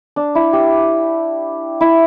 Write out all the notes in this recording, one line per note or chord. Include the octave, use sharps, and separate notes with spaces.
D4
E4
G4
E4